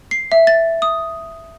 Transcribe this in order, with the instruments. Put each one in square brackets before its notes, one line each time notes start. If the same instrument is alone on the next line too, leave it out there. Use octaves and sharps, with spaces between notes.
[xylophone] C7
E5
A6
D#6